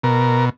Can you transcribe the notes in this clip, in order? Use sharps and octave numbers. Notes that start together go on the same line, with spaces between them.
B2 A#4